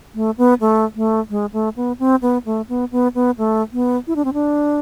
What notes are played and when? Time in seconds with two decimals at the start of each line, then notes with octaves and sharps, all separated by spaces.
0.14 A3
0.38 B3
0.61 A3
0.96 A3
1.30 G#3
1.53 A3
1.76 B3
1.99 C4
2.22 B3
2.45 A3
2.69 B3
2.92 B3
3.15 B3
3.38 A3
3.73 B3
4.07 E4
4.16 D4
4.25 C4
4.33 D4